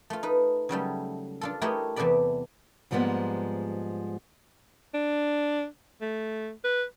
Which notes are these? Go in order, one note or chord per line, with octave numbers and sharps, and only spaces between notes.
A3 F4
D#4 B4
C#3 F#3 G3 A3
D4 F4 A4
A3 E4 G4 A#4 C#5 D#5
E2 C3 A3 B4 D5 B5
G#2 F3 G3 G#3 A#3 B3
D4
A3
B4